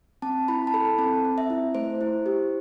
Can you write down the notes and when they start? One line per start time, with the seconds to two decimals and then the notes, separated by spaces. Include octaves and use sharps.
0.22 C4 A5
0.48 E4 B5
0.67 A5
0.74 A4 B5
0.98 C4 A5
1.25 C4
1.38 E5
1.50 E4
1.75 A3 C5
2.01 E4
2.26 G4